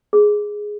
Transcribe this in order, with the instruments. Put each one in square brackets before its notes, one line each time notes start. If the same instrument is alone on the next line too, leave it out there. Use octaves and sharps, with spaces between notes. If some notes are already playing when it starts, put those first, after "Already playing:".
[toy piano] G#4